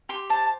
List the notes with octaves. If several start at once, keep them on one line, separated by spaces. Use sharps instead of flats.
G4 C6
C5 A5